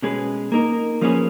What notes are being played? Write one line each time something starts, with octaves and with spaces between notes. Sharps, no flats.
B2 G#3 C#4 G#4 B4
A#3 D#4 A#4
F3 A#3 C#4 G#4 B4